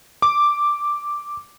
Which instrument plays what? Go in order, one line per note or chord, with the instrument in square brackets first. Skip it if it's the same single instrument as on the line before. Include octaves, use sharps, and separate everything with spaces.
[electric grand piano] D6